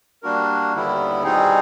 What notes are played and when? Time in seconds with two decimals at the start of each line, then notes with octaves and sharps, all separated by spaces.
0.23 G3 A#3 D4 F#4 A#4
0.73 D#2 D3 G3 B3 E4
1.23 B2 G3 C4 D#4 G#4